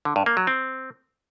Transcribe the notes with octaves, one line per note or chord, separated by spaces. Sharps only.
D3
G2
A#3
F#3
C4